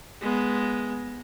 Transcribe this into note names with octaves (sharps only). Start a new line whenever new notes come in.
G#3 B3